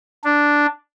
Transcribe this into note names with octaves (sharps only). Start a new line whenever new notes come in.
D4